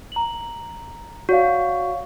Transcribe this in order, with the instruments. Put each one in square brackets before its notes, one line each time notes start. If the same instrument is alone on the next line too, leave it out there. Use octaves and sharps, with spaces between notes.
[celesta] A#5 F#7
[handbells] F#4 [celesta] C#5 D5 F5